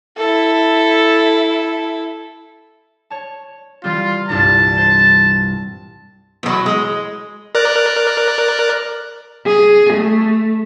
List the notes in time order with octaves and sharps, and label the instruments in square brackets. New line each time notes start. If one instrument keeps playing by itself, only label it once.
[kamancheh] E4 A4
[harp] C#5 A5
[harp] E3 G3 C4 [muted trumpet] F4
[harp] C2 G2 A#2 [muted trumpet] A5
[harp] C5
[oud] E2 F#3
G#3
[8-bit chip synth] A#4 D5 F#6
[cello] G#4
A3